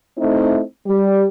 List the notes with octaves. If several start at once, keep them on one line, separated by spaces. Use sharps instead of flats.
A3 C4 D#4 E4
G3